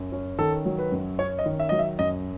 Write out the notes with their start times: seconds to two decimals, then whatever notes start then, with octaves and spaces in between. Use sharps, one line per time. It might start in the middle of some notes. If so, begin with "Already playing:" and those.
Already playing: F#2
0.12 C#4
0.38 D#3 A4
0.65 F#3
0.79 B4
0.92 F#2
1.19 C#4 C#5
1.39 D#5
1.46 D#3
1.60 E5
1.69 F#3 D#5
1.79 E5
1.99 F#2 D#5